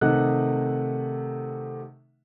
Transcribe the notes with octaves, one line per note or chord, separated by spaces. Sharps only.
C3 D#3 A3 D#4 F#5 F#6